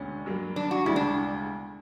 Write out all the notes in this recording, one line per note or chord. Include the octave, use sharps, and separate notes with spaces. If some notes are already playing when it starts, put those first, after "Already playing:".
Already playing: E1 D2 D3 C#4
G2 F#3 A#3
D4
F#4
E1 D2 C#3 G3 E4
D4